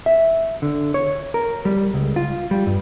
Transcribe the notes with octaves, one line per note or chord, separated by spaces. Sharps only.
E5
D3
C#5
A#4
G3
C#2
F4
G3
G2